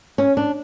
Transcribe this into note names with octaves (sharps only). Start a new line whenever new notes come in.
C#4
D4